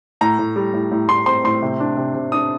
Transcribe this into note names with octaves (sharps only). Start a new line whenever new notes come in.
A2 A#5
A2
G3
A2
A2
A2 C6
C4 C6
A2 C6
C3
D4
C3
C3
D4 D#6